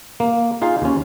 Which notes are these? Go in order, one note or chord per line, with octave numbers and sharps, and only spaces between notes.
A#3
D#4 F4 G#4 F5
D#2 C#4